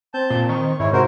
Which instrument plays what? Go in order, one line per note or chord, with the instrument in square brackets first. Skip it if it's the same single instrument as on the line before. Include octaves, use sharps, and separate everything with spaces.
[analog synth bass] C4 [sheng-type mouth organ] A5 G6
[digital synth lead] A#2
[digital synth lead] D#3 [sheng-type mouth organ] C#6
[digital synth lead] G#2 [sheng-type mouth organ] E4 C#5
[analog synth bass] C3 [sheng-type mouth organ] F#4 A#4 C5